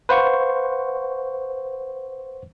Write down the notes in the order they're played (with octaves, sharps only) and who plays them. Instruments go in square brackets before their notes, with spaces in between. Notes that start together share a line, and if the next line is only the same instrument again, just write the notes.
[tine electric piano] B4 C5 F5 F#5 C#6